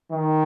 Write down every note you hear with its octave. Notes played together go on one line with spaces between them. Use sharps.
D#3